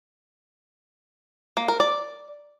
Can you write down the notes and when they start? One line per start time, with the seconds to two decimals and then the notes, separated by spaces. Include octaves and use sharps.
1.57 A#3
1.68 A#4
1.80 D5